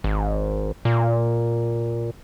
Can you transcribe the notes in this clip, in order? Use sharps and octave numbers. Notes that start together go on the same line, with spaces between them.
G#1
A#2